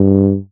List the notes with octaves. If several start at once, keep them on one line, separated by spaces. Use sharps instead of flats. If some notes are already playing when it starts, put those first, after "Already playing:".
Already playing: G2